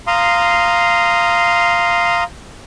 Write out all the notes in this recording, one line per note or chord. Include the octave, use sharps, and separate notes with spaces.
F5 A#5 C6 D#6